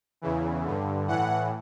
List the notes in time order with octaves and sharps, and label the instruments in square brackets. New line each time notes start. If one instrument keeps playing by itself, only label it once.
[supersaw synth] E2 C#3 E3
G2 D3
A2 E3 F#5